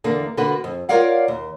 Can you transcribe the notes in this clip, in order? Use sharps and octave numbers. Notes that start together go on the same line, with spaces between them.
E2 D3 A#3
D3 A#3 F#4 B4
F2
F4 A#4 C#5 D5 F5 F#5
D#2